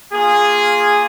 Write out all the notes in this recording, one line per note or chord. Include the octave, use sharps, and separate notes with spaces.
A#3 F4 G#4